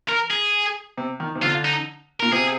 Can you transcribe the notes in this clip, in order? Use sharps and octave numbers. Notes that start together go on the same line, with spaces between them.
A#4
G#4
C3
D#3
C3
D3 F4
D#4
A#2 A#4
C3 G#4